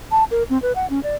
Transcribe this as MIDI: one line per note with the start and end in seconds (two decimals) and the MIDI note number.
0.11 0.24 81
0.31 0.43 70
0.50 0.60 60
0.62 0.72 71
0.76 0.89 78
0.90 1.02 61
1.03 1.16 74